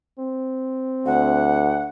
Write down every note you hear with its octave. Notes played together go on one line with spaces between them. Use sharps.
C4
D2 F#5